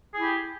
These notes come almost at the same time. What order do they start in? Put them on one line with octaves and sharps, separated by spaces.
G#4 E4 G4